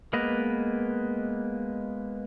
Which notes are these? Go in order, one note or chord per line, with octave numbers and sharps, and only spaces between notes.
G#3 A#3 B3 B4 D#5